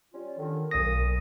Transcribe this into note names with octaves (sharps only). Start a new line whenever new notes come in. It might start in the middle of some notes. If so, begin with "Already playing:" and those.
G3 C#4 F4
D3 D#3
B1 A#2 D#6 A#6